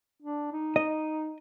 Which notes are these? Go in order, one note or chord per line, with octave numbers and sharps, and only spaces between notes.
D4
D#4
D#5